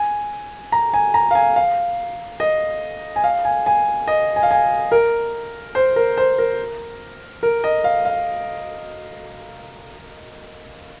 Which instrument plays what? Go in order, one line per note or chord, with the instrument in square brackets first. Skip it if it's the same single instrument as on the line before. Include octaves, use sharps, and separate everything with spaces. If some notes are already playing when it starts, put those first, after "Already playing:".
Already playing: [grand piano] G#5
A#5
G#5
A#5
F5
G#5
F5
D#5
G#5
F5
G#5
G#5
D#5
G#5
F5
G#5
A#4
C5
A#4
C5
A#4
A#4
D#5
F5
F5